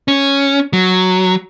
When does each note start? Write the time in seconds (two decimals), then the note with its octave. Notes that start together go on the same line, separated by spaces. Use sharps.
0.08 C#4
0.73 F#3